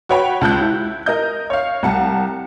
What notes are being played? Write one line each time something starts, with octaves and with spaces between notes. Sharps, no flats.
F#4 B4 C#5 G5 B5
C#2 A5 F#6 G6
E4
A#4 D#5 G6
C#5 F5
C2 F#5 A5